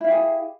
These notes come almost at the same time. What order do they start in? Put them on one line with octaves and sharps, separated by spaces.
E4 F5 G4 G#4